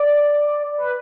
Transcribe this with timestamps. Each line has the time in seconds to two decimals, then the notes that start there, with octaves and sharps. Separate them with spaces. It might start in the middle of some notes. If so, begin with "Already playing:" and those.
Already playing: D5
0.78 B4